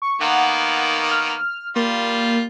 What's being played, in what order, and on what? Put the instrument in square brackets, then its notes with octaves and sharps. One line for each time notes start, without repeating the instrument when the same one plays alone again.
[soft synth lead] C#6
[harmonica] D#3 A#3 B3 [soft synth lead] F#5
[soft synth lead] F6
[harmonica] G3 F4 [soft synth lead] A#3